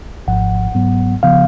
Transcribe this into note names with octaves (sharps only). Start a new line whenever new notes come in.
G#1 G#2 F3 F#5
G#2 F#3 B3
C#3 F3 B3 F5